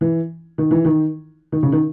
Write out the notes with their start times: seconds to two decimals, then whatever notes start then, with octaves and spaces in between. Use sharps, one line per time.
0.01 E3
0.58 D#3
0.71 E3
0.85 D#3
1.52 D#3
1.63 C#3
1.72 D#3